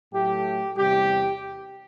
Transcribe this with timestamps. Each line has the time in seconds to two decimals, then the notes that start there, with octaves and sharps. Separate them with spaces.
0.13 A2 F#3 A3 G4
0.76 E2 C3 G3 G4